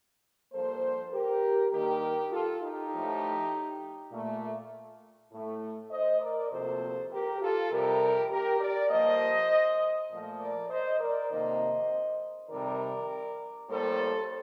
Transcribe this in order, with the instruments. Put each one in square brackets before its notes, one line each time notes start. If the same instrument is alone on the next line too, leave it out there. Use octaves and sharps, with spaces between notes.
[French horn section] G2 F3 A#3 A4 C5
G4 A#4
G2 D#3 A#3 G4 A#4
F4 A4
D#4 G4
A2 F3 A3
A#2 A3
A2 A3
C5 D#5
A#4 D5
D2 C3 F3 A#3 A4 C5
G4 A#4
F4 A4
F2 C3 G3 G4 A#4
G4 A#4
A#4 D5
G2 F3 A#3 C5 D#5
A#2 F3 A3
A#4 D5
C5 D#5
A#4 D5
F2 C3 D#3 A#3 C5 D#5
F2 C3 D#3 G3 A#4 D5
A2 G3 A#3 A4 C5